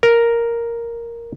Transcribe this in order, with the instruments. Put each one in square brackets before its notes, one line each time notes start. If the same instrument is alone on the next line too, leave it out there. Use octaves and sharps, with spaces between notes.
[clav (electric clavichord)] A#4